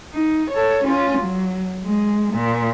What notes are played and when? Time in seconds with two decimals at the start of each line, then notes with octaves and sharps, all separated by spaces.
0.13 D#4
0.50 A4 C#5
0.84 C#4 F4
1.18 F#3
1.84 G#3
2.33 A#2